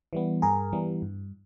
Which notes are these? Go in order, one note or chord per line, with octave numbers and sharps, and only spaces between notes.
E3 G3 B3
G2 G#4 A#4
E3 G3 B3
G2